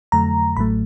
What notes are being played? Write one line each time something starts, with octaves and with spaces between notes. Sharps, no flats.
F2 D3 F#3 A3 A#5
A1 A2 F#3 A3 B5